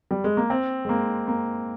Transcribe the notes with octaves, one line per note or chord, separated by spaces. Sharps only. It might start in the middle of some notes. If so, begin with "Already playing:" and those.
G3
G#3
A#3
C4
G#3
A#3
A#3